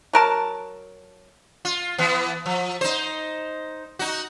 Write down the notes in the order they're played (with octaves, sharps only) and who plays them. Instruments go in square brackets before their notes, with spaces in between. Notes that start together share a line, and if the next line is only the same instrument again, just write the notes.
[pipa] F#3 A#4 A5
[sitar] F4
E3 B3
F3
D#4 C5
D#4 F#4